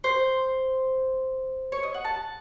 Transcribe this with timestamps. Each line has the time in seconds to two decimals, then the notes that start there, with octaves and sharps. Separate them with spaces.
0.04 C5
1.72 C#5
1.83 D#5
1.94 F#5
2.05 A5